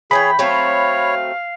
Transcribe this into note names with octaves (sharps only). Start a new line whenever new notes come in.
E3 G#4 C#5 D5 G5 B5
F#3 A3 C4 C#5 F5